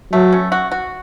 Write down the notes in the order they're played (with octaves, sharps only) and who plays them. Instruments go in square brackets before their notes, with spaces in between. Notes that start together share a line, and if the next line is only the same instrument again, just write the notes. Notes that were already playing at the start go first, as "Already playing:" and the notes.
[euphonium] F#3 [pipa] A3
[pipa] C#4
F#4
F#4